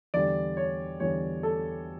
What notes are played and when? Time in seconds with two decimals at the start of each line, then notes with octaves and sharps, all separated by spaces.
0.14 E2 D3 G3 D5
0.57 C#5
1.00 E2 D3 G3 C#5
1.43 A4